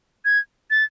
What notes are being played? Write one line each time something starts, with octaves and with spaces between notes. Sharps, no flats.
G#6
A6